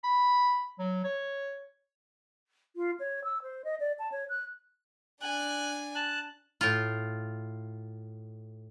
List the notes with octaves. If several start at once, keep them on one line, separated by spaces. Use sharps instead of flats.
B5
F#3
C#5
F4
C#5
E6
C5
D#5
D5
A5
C#5
F#6
D4 G#5 F#6
A5 F#6
A2 F4